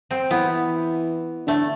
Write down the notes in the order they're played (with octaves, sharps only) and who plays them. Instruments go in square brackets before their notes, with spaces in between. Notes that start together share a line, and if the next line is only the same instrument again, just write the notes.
[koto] C4
[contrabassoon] E3 [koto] B3
[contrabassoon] D3 [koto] A3